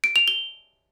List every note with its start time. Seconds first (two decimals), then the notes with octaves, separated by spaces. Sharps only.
0.04 D7
0.16 F7
0.28 G7